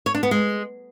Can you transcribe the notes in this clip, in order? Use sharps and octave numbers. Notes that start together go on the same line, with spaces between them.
C#5
D4
B3
G#3